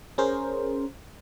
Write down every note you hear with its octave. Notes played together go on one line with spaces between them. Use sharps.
C#4 G#4 A#4 C5